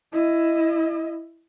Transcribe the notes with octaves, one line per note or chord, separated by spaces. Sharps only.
E4 D#5